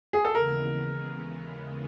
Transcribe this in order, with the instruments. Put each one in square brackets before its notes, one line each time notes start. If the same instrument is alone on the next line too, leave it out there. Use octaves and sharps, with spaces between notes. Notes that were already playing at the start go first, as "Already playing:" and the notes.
[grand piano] G#4
A4
[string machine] D#2 C#3 E3 G#3 B3 [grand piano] A#4